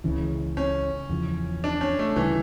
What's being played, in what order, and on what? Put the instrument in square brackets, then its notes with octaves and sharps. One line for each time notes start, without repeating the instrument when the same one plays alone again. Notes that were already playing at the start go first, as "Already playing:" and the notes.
[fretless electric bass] C#2 C#3 E3
[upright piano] C#4
[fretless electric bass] E2 C#3 F3
[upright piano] D4
C#4
A3
[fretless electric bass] D2 C#3 G3 [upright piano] E3